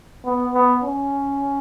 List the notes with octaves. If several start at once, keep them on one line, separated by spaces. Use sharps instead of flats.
B3
B3
C#4